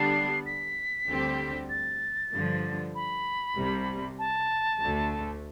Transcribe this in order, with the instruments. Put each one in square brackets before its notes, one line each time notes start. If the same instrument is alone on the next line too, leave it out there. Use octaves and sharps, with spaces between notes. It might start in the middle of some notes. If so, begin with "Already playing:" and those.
Already playing: [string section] D3 G3 B3 D4 [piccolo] C7
[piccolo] B6
[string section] D2 D3 G3 C4 G4
[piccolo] A6
[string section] G2 D3 F3
[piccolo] B5
[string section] C2 C3 G3
[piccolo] A5
[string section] D2 D3 A3